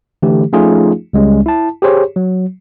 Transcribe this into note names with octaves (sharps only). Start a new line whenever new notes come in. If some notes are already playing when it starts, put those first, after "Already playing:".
D3 E3 A3 G4
F3 A3 C#4 D#4 F4 G#4
C#2 G3 G#3 C#4
E4 A5
G4 G#4 C5 C#5
F#3